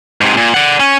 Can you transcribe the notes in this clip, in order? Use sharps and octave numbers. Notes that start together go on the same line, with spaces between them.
G#2 C3
A#2
D5 F#5
C#4